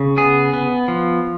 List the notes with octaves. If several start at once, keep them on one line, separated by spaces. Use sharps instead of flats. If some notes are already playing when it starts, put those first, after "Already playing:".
Already playing: C#3
B3 G#4
B3
F3